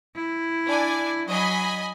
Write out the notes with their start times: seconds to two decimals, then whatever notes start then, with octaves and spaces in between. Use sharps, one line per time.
0.15 E4
0.66 D4 D5 G#5
1.29 F#3 D#5 G#5 B5